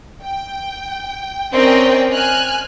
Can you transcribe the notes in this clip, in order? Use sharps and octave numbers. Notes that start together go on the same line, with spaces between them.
G5
C4 C#4 A#4 D5 D#5 G5
G#5 F6 F#6